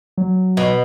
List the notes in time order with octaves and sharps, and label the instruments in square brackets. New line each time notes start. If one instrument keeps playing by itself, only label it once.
[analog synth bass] F#3
[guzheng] B2